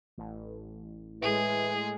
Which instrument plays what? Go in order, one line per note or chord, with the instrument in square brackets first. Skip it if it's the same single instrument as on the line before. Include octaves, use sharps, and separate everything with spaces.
[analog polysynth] A1
[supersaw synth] A2 G#3 [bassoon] E3 [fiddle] G#4